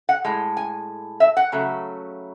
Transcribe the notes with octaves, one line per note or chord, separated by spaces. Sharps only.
F#5
A2 G#3
G#5
E5
F#5
C#3 F#3 A3